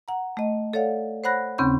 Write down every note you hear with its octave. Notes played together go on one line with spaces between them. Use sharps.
F#5 A#5
A3 D#5
A4 C#5 D5 F5 F#5
C5 C#5 F#5 B5 F#6 A#6
D#2 C#3 C4 C#4 B5 G6